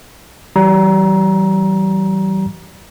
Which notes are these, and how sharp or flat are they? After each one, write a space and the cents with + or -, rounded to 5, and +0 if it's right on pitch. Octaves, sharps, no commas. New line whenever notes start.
E3 +0 G3 -35 A#5 +20